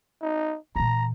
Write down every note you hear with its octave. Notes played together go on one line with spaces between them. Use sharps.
D#4
A#2 E3 A#5